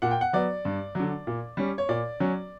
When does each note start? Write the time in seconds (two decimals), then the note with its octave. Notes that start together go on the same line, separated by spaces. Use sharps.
0.02 A#2 F#5
0.11 G5
0.21 F#5
0.33 F#3 B3 D5
0.65 G2
0.95 D3 F#3
1.27 A#2
1.57 G3 C#4
1.78 C#5
1.89 A#2 D5
2.20 F#3 C#4